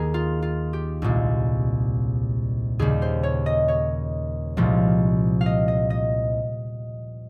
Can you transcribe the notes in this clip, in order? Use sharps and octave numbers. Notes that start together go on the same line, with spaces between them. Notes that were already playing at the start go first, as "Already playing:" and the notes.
Already playing: D#2 D#3 G#4 A#4
F4
F4
G4
C2 A#2 G#3
D#2 C#3 G3 G#4
C5
C#5
D#5
C#5
C2 A#2 F3 G#3
F5
D#5
D#5
D#5